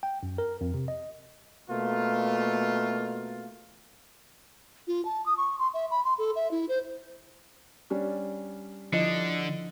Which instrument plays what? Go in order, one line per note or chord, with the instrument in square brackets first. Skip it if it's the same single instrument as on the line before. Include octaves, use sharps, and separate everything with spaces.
[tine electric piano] G5
F#2
A#4
F2
C3
D#5
[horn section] B2 A3 A#3 F4
[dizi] F4
A5
D#6
C#6
C6
E5
B5
C6
A4
E5
E4
C5
[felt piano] G3 C#4 D4
[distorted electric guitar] D3 [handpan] F3 E4 D#5